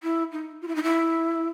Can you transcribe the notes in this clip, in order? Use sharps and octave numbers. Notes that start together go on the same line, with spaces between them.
E4
D#4
F4
E4
D#4
E4